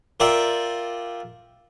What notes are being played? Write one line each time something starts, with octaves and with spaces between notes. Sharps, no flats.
F4 A#4 D5 E5 G5 D6